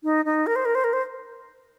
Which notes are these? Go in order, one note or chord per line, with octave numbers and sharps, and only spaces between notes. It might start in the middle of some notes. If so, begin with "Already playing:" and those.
D#4
D#4
A#4
C5
A#4
C5
A#4
C5